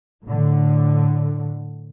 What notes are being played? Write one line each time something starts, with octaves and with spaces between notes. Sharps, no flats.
A2 D3